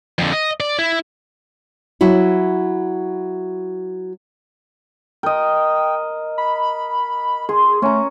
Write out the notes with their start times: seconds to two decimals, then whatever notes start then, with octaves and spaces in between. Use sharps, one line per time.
0.18 F2 D3
0.33 D#5
0.60 D5
0.79 E4
2.01 F#3 E4 F#4
5.23 A#4 D#5 G5
6.38 B5
7.49 G#4 C6
7.82 A3 C#4 A#5